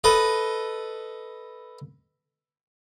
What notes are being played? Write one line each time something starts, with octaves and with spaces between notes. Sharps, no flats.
A4 B4 D#5